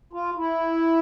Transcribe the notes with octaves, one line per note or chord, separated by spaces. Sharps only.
F4
E4